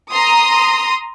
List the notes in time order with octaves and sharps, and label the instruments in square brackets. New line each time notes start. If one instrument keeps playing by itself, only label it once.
[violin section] A#5 C6 D#6